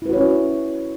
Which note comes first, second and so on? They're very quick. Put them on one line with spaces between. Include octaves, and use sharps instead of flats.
E4 B4 F#4 C#5 C#4